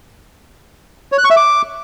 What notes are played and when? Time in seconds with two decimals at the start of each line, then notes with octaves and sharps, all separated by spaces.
1.12 C#5
1.18 F#6
1.24 C#6
1.30 E5
1.37 D6